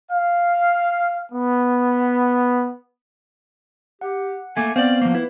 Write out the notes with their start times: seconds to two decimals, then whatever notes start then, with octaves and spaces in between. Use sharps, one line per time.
0.10 F5
1.31 B3
4.01 G4 F#5
4.57 A3 A#3 G#5
4.76 B3 C4 C5 D5 F5
5.01 F3 A#3
5.15 E4 B4